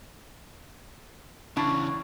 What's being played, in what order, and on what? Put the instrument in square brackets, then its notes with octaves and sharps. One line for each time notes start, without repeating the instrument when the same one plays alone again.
[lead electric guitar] E2 C#3 [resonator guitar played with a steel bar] D4 E4 A5 [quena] C#6